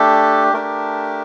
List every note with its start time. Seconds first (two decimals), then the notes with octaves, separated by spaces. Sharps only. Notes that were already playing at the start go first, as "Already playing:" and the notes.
Already playing: A3 D4 G4 A4
0.53 A3 D4 G4 A#4